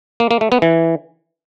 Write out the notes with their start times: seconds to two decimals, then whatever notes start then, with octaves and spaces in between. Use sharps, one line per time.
0.20 A#3
0.31 A#3
0.41 A3
0.52 B3
0.62 E3